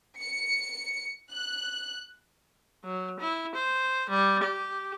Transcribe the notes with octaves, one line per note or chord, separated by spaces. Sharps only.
C#7
F#6
F#3
E4
C5
G3
G4